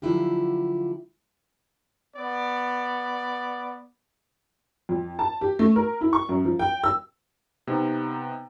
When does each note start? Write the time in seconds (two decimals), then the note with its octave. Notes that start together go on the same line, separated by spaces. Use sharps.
0.02 D3 F3 F#3 E4 F4 G4
2.14 B3 D5
4.89 F2
5.19 A5
5.41 G4
5.59 A3
5.76 A#4
6.01 E4
6.13 C#6
6.29 F#2
6.45 F3
6.59 G5
6.84 E6
7.67 C3 B3 D#4